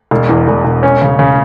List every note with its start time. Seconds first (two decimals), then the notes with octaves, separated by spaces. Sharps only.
0.11 E1
0.29 E2
0.48 E1
0.65 E1
0.83 C#4
1.02 C#3
1.19 C#3